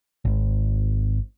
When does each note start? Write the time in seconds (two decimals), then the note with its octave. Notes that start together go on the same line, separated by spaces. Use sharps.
0.25 G#1